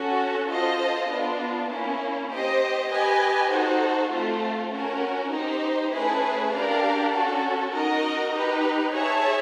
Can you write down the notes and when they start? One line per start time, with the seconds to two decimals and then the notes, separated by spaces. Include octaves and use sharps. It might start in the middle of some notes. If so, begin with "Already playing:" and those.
Already playing: C#4 F#4 A4
0.50 F4 A4 C5 D#5
1.10 B3 D4 F4
1.70 A#3 C#4 E4
2.30 G4 C5 D#5
2.91 G4 B4 D#5 G#5
3.51 D#4 F#4 A4 C5
4.11 A3 C4 F4 A4
4.72 C#4 F#4 A#4
5.32 D#4 G4 C5
5.92 A3 C#4 E4 G#4 B4
6.53 D4 G4 A#4 D5 F5
7.12 C#4 F#4 A4
7.74 D#4 F#4 A#4 D#5
8.34 D#4 G4 B4
8.93 G#4 C#5 E5 A5